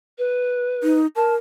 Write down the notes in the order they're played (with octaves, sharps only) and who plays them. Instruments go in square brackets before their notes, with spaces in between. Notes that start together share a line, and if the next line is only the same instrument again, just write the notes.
[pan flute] B4
[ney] D#4
[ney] A#4 [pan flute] A5